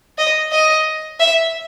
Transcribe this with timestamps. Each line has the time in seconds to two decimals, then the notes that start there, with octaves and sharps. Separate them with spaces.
0.18 D#5
0.52 D#5
1.20 E5